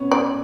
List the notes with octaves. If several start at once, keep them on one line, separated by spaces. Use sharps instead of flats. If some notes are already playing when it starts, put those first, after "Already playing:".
Already playing: B3 C#4
D5